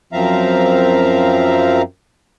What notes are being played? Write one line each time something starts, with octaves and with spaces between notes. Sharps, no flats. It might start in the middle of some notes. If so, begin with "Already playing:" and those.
F#2 F3 C4 E5 F5 A#5